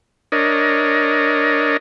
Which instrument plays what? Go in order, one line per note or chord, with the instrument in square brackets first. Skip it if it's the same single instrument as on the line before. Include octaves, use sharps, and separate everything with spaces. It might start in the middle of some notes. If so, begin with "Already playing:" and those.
[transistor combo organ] D4 A#4 C#5 D#5